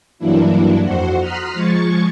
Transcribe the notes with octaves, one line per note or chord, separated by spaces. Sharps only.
G2 E3 F#3 A#3 D4 E4
F2 F#4 C5 F#5
A#5 C6 D#6 F6 F#6 B6
F3 G#3 C#6 G#6 A6 C#7